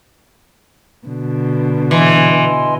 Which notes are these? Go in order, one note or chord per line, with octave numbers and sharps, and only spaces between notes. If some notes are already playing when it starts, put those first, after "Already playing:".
B2 D3
E3 D#5 G#5 C6